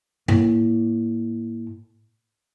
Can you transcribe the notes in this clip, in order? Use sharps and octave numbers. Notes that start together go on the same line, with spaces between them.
A2 A#3